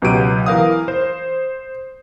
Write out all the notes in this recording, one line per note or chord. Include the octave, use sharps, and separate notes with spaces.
C#2 B2 F#3 G4 D7 D#7
E3 A#4 F5 D#6
C5